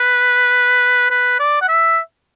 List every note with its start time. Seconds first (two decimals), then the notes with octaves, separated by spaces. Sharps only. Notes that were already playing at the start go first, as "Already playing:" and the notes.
Already playing: B4
1.11 B4
1.40 D5
1.61 F#5
1.68 E5